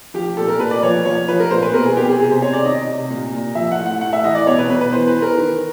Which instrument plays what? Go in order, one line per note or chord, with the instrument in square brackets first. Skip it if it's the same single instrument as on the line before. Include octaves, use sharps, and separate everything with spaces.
[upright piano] F3 G4
A#2 A4
A#4
A#2 B4
D5
F3 C#5
F3 C#5
F3 B4
A#4
A#2 C5
B4
B2 A#4
G#4
B2 G4
G#4
C3 G#4
C5
C3 C#5
D5
D#3 D#5
C3
A#2
A#2
F3 E5
F#5
A2
F#5
A2 F#5
E5
E3 D#5
D5
B2 C#5
B4
B2 B4
B4
E3 C5
B4
E3
A#4
D#3